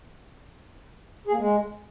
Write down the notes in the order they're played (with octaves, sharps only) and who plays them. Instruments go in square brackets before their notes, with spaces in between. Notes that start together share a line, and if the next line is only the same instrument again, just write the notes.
[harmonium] G#4
A#3
G#3